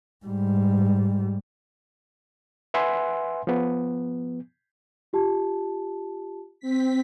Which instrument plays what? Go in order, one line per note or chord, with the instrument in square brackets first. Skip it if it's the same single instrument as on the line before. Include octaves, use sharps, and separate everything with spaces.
[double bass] G#2 G3
[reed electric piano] B4 E5 F#5 G#5 C6
F3 B3
[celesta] F4 G4 A5
[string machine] C4 B6